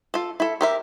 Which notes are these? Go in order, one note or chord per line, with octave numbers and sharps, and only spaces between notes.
F4 A4
E4 A4
G4 A#4 E5